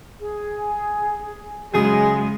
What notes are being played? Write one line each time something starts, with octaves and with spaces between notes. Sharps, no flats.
G#4
F#2 C#3 G#3 G#4 D#6